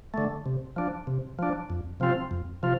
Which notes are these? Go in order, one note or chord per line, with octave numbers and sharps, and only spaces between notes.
D3 A3
C3
F3 D4
C3
F3 D4
F2
C3 F3 C4 F4
F2
C3 F3 F4